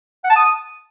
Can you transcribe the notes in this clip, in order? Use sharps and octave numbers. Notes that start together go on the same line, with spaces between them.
F#5
A5
D#6